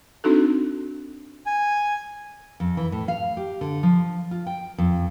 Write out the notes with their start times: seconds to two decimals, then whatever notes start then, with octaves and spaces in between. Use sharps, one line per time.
0.24 C4 D4 D#4 F#4 A4
1.46 G#5
2.60 F2
2.77 E3
2.92 A2
3.08 F5
3.37 G4
3.61 D3
3.83 F3
4.31 F4
4.47 G5
4.78 F2